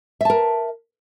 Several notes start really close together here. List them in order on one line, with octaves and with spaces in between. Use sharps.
E5 A5 A#4